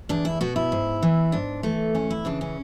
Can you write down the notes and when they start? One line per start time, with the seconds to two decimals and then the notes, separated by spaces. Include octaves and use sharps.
0.09 E2 D4
0.25 E4
0.41 B2 F#4
0.56 E4
0.72 G#2
1.03 E3
1.32 G#2 D4
1.63 E3 A3
1.95 E2 C#4
2.10 E4
2.25 C#3 E3 D4
2.41 C#4